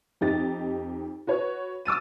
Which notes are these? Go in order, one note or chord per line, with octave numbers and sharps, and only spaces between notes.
F2 D#4 G4 A6
F#4 B4 C#5
D6 E6 A6 D#7